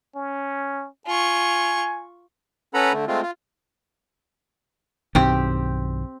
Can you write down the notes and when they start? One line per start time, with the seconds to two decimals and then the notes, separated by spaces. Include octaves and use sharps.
0.16 C#4
1.07 F4 G#5 C#6
2.74 C#4 A4 B4 F#5 A#5 B5
2.93 D3 A3
3.07 G#3 A3 C4 F4
3.22 F4
5.15 B1 G2 D#3 C4 G4